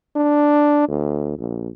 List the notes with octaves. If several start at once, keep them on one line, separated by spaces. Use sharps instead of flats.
D4
D2
A#1